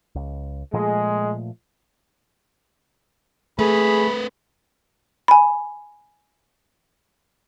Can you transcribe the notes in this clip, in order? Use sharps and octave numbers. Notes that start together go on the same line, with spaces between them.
C#2
A#2 F3 G#3 A3
A3 C4 G#4 B4 B5
G#5 B5